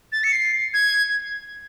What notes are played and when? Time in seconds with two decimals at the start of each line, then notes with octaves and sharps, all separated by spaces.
0.12 A6
0.24 C#7
0.32 C7
0.74 G#6